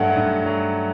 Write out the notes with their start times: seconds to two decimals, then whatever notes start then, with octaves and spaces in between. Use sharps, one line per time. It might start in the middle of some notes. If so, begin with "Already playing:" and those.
Already playing: G2 F#3 A3 F#5
0.16 G2
0.46 F#3